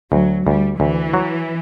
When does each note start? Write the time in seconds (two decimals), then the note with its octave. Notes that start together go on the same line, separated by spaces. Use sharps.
0.12 D2 F#3
0.46 D2 G3
0.80 D2 E3
1.14 F#3